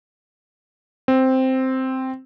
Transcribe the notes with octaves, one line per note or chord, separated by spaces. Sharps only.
C4